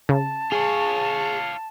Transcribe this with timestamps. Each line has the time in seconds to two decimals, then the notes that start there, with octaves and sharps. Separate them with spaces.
0.09 C#3 A5
0.52 F4 G#4 C#5